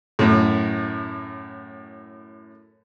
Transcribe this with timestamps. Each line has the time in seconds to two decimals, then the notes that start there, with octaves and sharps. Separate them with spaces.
0.19 F#2 A2